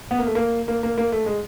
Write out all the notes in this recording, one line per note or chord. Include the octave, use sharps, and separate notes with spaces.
B3
A#3
A3
A#3
A#3
A#3
A#3
A3
G#3